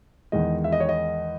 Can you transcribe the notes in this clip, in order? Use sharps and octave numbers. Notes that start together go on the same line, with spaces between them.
E2 D#3 G#3 D#5
E5
D#5
C#5
D#5